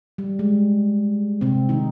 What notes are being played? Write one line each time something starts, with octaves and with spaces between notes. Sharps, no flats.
G3
G#3
C3 C4
D#3 D#4